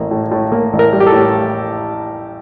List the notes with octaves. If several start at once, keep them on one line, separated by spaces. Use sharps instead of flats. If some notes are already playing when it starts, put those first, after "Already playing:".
Already playing: A1 A#3
A2
A2
A#3
A1
A#4
G3
G4
A4
A2